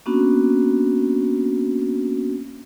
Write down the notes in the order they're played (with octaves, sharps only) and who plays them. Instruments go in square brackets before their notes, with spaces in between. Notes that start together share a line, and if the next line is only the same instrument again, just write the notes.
[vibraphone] A#3 B3 C#4 D4 F#4